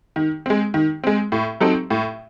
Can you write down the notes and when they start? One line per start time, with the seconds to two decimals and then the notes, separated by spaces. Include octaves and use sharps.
0.16 D#3
0.46 G#3 C4
0.74 D#3
1.04 G#3 C4
1.32 A2
1.61 F#3 C4 D#4 A4
1.90 A2